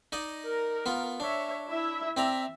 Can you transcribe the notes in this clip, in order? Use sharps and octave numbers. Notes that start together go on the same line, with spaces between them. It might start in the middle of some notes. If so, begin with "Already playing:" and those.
D#4 D5 D#5
A#4
B3 F4
D4 C#5 E5
E4 E5
C4 D5 E5 A#5